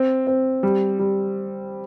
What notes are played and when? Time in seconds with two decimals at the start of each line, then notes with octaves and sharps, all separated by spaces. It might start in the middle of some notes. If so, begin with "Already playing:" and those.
Already playing: C4
0.27 C4
0.63 G3
0.99 G3